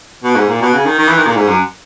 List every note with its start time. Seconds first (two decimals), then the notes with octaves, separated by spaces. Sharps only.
0.24 B2
0.36 G#2
0.49 A#2
0.61 B2
0.74 C#3
0.86 D#3
0.98 D#3
1.08 E3
1.18 D#3
1.26 A#2
1.36 G#2
1.48 F#2